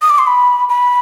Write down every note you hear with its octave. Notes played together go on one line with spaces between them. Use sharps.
D#6
D6
C6
B5
B5